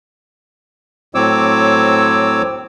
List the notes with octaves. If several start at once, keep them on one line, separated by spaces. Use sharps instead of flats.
A2 F#3 C4 C#5 D6 E6